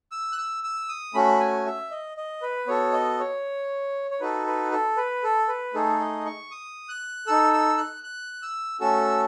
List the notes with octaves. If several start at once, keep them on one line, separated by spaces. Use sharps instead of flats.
E6
F#6
E6
E6
D#6
A3 C#4 F#4 B5
G#5
E5
D#5
D#5
B4
B3 F#4 A4 C#5
D#5
C#5
C#5
D#4 F#4 A4 B4
B4
A4
B4
A4
B4
A3 D#4 G#4 A4
D#5
C#6
D#6
F#6
D#4 A4 E6
E6
F#6
F#6
E6
A3 C#4 F#4 A4 E6